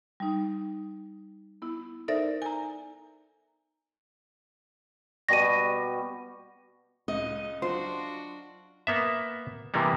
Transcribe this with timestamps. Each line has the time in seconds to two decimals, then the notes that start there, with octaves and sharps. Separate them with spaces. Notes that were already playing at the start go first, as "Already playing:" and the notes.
0.20 G3 D#4
1.62 B3 E4
2.08 D#4 A4 A#4 C5 D5 E5
2.42 G#5 A#5
5.29 B2 G3 F#4 A#6 D#7
7.08 C#2 D#5
7.62 F#3 D4 F4 F#4 C5
8.87 A#3 B3 E5
9.74 C3 E3 G3 A#3 B3